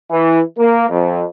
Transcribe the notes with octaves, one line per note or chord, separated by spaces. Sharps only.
E3
A#3
F2